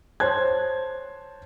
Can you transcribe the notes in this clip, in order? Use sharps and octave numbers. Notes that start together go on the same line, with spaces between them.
C5 C#5 A5 F#6 G#6